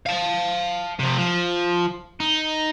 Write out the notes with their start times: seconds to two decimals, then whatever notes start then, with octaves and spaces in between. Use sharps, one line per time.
0.06 F5 A5
0.99 C3 F3
1.18 F3
2.20 D#4